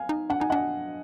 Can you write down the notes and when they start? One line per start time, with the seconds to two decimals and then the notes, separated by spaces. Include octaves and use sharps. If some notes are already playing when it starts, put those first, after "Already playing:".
Already playing: F5 G#5
0.09 D#4
0.30 D4 F#5
0.40 D#4 G#5
0.50 D4 D#5 F#5